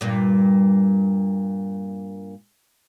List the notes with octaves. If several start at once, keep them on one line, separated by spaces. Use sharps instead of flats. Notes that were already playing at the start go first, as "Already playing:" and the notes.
G2 A#2